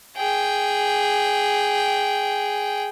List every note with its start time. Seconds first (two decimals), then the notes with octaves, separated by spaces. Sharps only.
0.16 G#4 G5